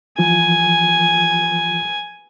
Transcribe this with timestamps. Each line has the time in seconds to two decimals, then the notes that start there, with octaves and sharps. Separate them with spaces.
0.19 E3 F3 F4 G#5